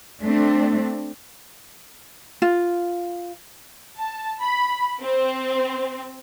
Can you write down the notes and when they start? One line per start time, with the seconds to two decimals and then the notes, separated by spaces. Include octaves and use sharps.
0.23 A3 C4 D4
2.42 F4
3.97 A5
4.41 B5
5.02 C4